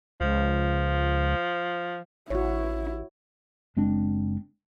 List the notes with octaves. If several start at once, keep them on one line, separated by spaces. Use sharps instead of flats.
C#2 F3
A1 E4 F#4 C#5
F#1 G#3 C4 D4